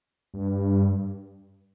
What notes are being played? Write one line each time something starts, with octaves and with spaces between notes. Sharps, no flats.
G2